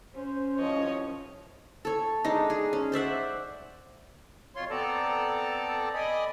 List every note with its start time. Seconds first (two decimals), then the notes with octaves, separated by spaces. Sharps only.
0.15 C#4 C5
0.59 C2 G#2 F3 C#5 D#5
1.85 A4 C#5
2.25 G#3 D4 D#4
2.50 G#4
2.73 C#4
2.92 C5 D5 E5 F#5
4.56 F2 B2 F4 C#5 C6
4.70 B3 C4 A4 D5 A5 A#5
5.94 D5 D#5 G#5 B5 D#6